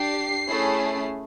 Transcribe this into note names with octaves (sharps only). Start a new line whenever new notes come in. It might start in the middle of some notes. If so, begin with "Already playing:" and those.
Already playing: D4 G4 C7
A3 C#4 E4 G#4